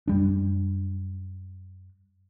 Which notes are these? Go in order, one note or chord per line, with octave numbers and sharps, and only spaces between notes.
F#2 G3 D4